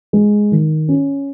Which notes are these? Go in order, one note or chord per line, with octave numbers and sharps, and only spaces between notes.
G#3
D#3
C#4